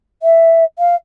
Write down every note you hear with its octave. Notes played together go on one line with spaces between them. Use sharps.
E5
F5